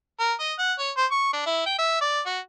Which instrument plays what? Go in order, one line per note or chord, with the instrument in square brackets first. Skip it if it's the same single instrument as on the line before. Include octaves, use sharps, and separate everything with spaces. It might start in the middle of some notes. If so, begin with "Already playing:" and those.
[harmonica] A#4
D#5
F#5
C#5
C5
C#6
D4
E4
G5
E5
D5
F#4